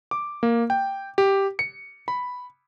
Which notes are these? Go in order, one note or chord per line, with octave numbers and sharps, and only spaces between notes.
D6
A#3
G5
G4
C#7
B5